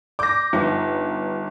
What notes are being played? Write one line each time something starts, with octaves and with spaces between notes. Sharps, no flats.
D5 D6 G6 A#6
G1 D#4 F4 G5